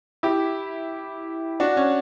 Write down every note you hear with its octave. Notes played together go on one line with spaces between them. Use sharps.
E4 G4
D4 F#4
C#4